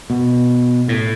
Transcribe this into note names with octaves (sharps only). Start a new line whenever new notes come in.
B2
A2